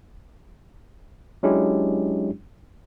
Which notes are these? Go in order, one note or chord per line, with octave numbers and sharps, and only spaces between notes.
F#3 G#3 C#4 D4 E4 G4